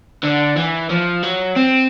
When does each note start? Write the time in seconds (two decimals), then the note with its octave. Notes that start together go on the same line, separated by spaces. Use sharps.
0.23 D3
0.57 E3
0.90 F3
1.23 F#3
1.56 C4